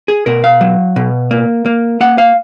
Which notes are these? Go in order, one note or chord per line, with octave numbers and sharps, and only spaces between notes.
G#4
B2 A#4
F5
F#3
B2
A#3
A#3
A#3 F#5
F5